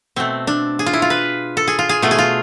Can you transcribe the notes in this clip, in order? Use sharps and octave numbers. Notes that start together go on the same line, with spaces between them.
B2 A3 C4
D4
G#4
F4
E4
F4
B4
A4
G#4
F4
G#4
B2 A3 F4
G#4
F4